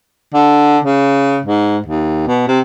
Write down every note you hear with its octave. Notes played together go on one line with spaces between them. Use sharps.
D3
C#3
G#2
D#2
B2
C3